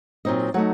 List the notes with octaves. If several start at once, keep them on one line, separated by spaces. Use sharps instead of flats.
A#2 F#3 C4 D#4 D#5
F#3 A3 D#4 F#5